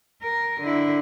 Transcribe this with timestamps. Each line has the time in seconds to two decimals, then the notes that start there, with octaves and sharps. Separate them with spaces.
0.22 A#4
0.60 D3 E4